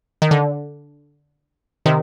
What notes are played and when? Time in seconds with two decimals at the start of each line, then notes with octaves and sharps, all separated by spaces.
0.22 D#3
0.31 D3
1.86 C3 D#3